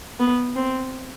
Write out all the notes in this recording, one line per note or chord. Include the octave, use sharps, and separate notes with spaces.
B3
C4